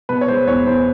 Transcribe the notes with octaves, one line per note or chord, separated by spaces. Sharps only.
B2 B4
C#5
G#3 C5
E2 C#5
E2 C5